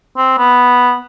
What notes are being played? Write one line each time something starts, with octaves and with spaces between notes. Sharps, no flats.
C4
B3